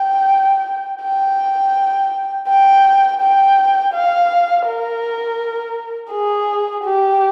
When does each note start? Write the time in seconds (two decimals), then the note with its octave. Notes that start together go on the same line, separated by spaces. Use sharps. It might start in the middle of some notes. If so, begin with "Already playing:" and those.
Already playing: G5
1.03 G5
2.49 G5
3.21 G5
3.94 F5
4.67 A#4
6.12 G#4
6.84 G4